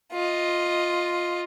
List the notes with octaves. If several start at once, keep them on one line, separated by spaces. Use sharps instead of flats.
F4 D#5